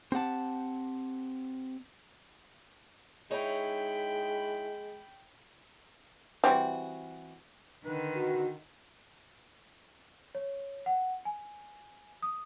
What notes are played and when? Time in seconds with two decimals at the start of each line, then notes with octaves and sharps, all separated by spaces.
0.12 C4 G4 F#5 A5
3.31 G#3 D#4 E4 C#5 G5 B5
6.44 E3 G3 C4 F#4
7.85 D3 D#3 B4
8.16 F#4
10.35 C#5
10.86 F#5
11.25 G#5
12.22 D#6